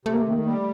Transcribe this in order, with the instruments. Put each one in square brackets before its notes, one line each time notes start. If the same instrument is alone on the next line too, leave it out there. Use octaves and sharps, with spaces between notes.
[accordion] C3 [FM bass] A3
[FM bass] A#3
A3
[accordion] D#3 [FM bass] A#3
[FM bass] A3
[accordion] G3 [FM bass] A#3
[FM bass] A3